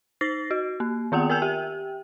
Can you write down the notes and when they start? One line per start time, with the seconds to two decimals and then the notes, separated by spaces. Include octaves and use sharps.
0.21 D#4 A6 A#6 C7
0.51 F#4
0.80 A#3
1.12 D#3 B3 F4 F#5 G5
1.30 A#4 G5 G#5 E6 G6 F7
1.42 G4 G5